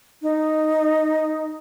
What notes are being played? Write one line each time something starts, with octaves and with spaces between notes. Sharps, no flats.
D#4